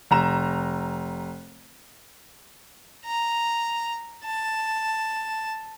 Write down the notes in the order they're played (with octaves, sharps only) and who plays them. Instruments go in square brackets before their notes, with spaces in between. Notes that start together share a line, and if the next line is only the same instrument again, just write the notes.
[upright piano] F1 A#5 E7
[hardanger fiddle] A#5
A5